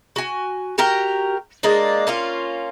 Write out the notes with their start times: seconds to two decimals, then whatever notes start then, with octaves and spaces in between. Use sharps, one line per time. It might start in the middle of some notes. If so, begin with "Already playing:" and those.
0.16 F#4 G#5
0.78 F#4 G4 A#4 G5
1.63 G#3 A#3 D4
2.07 A#3 C#4 F4